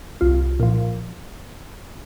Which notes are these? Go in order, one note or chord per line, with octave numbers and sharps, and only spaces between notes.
C2 F4
A#2 F3